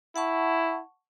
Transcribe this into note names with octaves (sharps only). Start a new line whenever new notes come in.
E4 F#5 A5 C#6